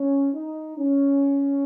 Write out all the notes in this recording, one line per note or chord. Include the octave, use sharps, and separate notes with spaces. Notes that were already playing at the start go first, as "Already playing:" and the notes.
Already playing: C#4
D#4
C#4